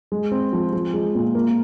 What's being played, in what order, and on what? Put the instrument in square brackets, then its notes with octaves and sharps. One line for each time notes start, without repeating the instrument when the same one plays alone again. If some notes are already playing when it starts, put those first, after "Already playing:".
[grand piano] G#3
C4
F3
F3
G#3
A#2
A#3